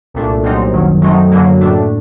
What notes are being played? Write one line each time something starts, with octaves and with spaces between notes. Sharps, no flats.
C2 A#2 A3 D4
C2 A#2 F#3 C4 D#4
G1 F#2 D#3 F#3
F#2 F#3 A3 C4 D#4
F#2 D3 F#3 A#3
A2 A3 D4